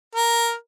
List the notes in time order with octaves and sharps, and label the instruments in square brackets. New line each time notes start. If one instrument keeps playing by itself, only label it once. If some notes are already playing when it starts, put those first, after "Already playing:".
[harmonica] A#4